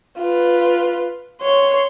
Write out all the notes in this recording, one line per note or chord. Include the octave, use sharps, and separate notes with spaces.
F4 B4
C#5 C6